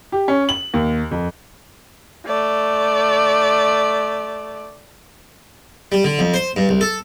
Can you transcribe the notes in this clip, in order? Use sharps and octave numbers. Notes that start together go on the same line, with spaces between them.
G4
C#4
F#7
D#2
F2
A3 D5
G3
D3
F2
C5
G2
C2
A4